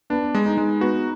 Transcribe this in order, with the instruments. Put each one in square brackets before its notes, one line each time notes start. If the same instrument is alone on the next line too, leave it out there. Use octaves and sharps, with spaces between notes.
[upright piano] B3 [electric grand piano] D4
[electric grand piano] G#3
[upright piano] D#4
[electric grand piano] G#3
[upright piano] B3 [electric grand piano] F#4